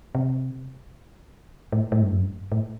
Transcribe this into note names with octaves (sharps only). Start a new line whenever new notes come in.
C3
A2
A2
G2
F#2
G2
A2